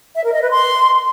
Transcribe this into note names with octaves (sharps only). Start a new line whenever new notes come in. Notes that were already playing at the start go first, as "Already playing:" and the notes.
E5
A#4
D#5
B4
C6